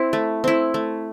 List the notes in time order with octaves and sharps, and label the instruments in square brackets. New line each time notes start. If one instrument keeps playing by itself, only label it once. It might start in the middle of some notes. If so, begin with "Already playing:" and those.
Already playing: [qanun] C4 E4
A3
C4 E4
A3